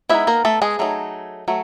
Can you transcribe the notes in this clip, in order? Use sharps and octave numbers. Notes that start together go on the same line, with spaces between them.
G#3 B3 D#4 E4 E5
A#3 A#4
A3 A4
G#3 G#4
F#3 A3 C4 D#4
F#3 A3